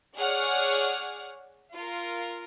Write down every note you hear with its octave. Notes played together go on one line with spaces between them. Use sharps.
G#4 C#5 D5 F#5 C#6 F6
F4 A#4